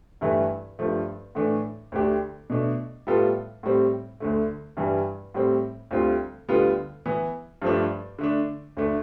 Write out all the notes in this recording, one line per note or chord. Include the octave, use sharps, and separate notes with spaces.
G2 E3 A3 E4 B4
G2 F3 A3
A2 E3 A3 D4
D2 D3 A3 D4 G4
B2 A3 D4
A2 G3 B3 F4 A4
A2 G3 C4
D2 D3 A3
G2 E3 G3
A2 G3 C4
D2 D3 G3 C4 F4
D2 D3 G3 B3 F4
E3 B3 E4
G2 F3 A3 D4
D3 A3 D4
D2 D3 A3 D4